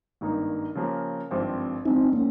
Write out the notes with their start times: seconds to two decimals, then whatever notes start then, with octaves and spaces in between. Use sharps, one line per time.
0.21 G#1 G2 D#3 A#3 D#4
0.75 C#3 F3 A#3 C#4 G4
1.31 G#1 G2 F3 C4 G4
1.85 A#1 G#2 F3 C4 D#4
2.13 A#3 C#4